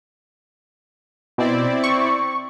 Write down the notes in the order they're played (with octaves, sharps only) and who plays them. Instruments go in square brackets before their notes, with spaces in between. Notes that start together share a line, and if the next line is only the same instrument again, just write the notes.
[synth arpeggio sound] B2 [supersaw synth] C4 E4 D5
[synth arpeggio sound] C#6